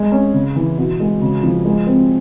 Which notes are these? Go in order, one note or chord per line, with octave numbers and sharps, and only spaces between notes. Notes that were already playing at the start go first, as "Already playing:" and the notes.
Already playing: G#3
C#4
C#3
E3
B2
G#3
C#3
F3
G#3
C4